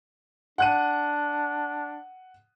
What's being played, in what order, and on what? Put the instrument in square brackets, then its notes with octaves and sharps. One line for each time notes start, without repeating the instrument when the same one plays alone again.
[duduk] D4 [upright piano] F#5 F#6 D#7